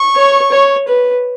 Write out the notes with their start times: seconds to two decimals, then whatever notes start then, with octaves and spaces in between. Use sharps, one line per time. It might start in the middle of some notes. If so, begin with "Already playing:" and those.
Already playing: C#6
0.16 C#5
0.51 C#5
0.88 B4